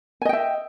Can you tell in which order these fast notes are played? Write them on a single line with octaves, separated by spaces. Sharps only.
G#5 D#5 G5 E5